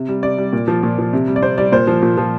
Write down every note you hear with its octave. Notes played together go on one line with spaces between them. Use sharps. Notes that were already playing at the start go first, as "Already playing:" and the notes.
Already playing: C3
G3
C3 D5
G3
A#2
F3
A#2
F3
C3
G3
D5
C3 C5
G3 D5
A#2 C5
F3
A#2
F3